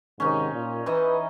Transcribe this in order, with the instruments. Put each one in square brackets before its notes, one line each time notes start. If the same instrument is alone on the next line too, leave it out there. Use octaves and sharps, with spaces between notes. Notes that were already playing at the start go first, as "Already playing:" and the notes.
[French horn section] G#2 C3 D#3 [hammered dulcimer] C#4 D#4
[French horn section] A#2
[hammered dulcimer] E3 D#4 D#5 [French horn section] B4